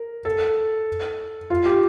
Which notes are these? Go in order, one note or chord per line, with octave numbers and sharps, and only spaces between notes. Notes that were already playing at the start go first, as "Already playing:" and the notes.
Already playing: A#4
A4
F4
G4